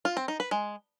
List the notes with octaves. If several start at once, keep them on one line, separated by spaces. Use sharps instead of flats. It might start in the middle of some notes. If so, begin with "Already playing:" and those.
F4
C4
D#4
B4
G#3